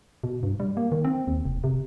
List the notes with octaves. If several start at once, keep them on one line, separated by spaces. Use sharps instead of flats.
B2
G2
G3
A#3
D#3
C4
D#2
F1
C3